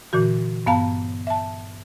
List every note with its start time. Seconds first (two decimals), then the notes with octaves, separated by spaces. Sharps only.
0.13 A#2 D3 E3 F#4
0.66 G2 B3 F5 A5 A#5
1.27 E5 A5